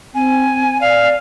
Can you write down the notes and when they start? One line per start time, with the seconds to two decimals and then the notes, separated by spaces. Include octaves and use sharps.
0.15 C4 G#5
0.81 D5 F5